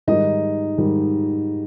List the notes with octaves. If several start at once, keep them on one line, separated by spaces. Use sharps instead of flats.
G#2 D#3 G3 D#4 D#5
G#2 D#3 G3